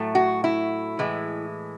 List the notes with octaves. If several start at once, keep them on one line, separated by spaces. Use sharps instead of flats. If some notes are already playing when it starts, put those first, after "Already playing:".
Already playing: A2 F#3 A3
F#4
E4
A2 E3 G#3